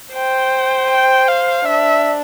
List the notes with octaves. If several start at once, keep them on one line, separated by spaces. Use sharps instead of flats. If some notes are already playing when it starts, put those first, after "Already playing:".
C5 G5
G5
F5
D4 E5